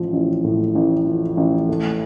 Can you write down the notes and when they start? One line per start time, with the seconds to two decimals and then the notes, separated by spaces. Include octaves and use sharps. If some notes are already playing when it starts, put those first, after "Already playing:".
Already playing: A1 F3
0.13 A1
0.44 A2
0.75 A1
1.07 F3
1.37 A1
1.69 A3